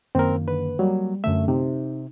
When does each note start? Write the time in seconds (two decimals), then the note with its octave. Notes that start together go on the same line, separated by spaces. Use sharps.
0.15 F#2 D#3 A#3 C4 A#4
0.48 D3 B4
0.79 F#3 G3 A#3
1.24 F#2 D3 A3 E5
1.48 C3 D#4